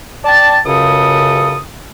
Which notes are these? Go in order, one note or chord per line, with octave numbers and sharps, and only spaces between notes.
D5 G5 A5
C#2 F#2 C#3 A4 D#6